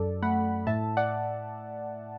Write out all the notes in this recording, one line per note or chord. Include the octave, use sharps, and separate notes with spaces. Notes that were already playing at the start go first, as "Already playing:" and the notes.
Already playing: F#2 A4 D5
A3 F#5 B5
A2 E5 A5
D5 F#5